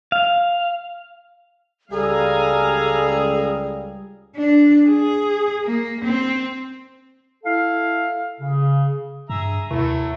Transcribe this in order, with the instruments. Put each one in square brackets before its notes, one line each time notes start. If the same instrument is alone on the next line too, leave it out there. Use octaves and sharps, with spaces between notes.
[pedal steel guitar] F5
[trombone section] C#2 G3 [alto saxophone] G#4 [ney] A4 [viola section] F5 G#5 A#5
[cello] D4
G#4
A#3
C4
[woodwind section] E4 A4 F5
C#3
[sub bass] G2 [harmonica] G#4 E5 A#5
[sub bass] D#2 [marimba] C3 [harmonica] F#3 A3 [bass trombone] E4